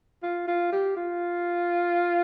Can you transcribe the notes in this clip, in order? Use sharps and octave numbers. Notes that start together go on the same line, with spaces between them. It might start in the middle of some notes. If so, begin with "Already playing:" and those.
F4
F4
G4
F4